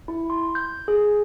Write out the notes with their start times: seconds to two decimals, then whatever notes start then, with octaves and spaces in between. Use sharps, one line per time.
0.08 E4
0.30 C6
0.55 G6
0.88 G#4